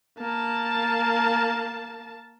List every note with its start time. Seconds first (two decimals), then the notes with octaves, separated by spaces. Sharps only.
0.18 A#3 A5